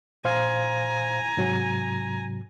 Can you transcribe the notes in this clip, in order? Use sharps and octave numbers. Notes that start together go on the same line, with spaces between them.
A#2 C5 F5 G#5 A#5
G#2 C3 F#3